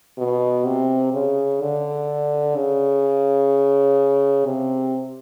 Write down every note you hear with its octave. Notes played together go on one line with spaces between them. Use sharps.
B2
C3
C#3
D3
C#3
C3